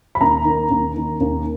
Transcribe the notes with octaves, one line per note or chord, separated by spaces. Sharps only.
B5
D#2 A#5
D#3 A#3
D#2
D#3 A#3
D#2